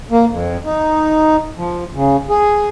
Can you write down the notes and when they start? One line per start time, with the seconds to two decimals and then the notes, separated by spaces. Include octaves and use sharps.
0.11 A#3
0.30 F2
0.65 D#4
1.57 F3
1.95 C#3
2.29 G#4